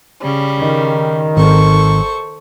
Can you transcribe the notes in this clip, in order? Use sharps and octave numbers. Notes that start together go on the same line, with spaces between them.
C#3 G3
D#3
G#1 A4 C5 C#6